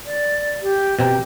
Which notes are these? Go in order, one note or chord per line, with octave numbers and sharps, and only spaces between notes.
D5
G4
B2 C4 G4 A#5